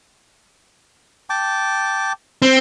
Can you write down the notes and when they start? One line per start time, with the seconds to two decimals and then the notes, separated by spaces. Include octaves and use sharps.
1.30 G5 A5 D6
2.42 C4